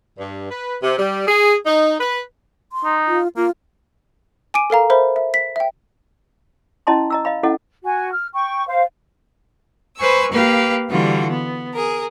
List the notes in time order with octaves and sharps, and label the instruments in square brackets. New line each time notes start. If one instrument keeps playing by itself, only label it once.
[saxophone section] G2
B4
C3
G3
G#4
D#4
B4
[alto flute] C6
[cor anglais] D#4
[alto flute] F4
[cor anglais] A#3 [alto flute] F4
[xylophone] G#5 D6 D7 D#7
A4 A#4 F5 A#5
A#4 C5 E5 B5
E5
B6
E5 G5
[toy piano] C#4 E4 D#5 A5 A#5 C6
D#5 A#5 E6
D#5 F5 B5
C#4 E4 A4 D#5 F#5
[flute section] F#4 G#5
F6
G5 C#6
C5 F5
[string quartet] B4 C5 G#5 C#6 E6
A#3 G4 B4 F5
D3 E3 G3 F4 F#4
B3
G#4 A#4